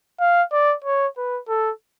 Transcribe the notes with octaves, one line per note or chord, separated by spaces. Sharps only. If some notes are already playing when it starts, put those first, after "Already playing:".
F5
D5
C#5
B4
A4